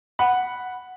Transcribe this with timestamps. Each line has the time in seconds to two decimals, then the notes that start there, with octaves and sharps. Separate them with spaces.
0.19 F#5 B5